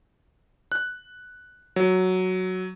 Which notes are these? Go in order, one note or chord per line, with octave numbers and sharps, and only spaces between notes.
F#6
F#3